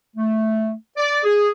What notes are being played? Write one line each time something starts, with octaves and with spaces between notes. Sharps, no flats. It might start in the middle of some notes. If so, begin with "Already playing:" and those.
A3
D5
G#4